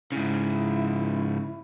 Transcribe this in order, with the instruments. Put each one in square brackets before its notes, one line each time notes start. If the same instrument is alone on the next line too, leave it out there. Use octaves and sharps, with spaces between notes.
[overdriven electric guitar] G#2 C#3 [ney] E4